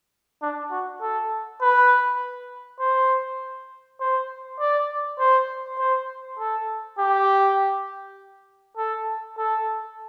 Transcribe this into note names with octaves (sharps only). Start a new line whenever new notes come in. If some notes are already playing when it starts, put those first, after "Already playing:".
D4
F#4
A4
B4
C5
C5
D5
C5
C5
A4
G4
A4
A4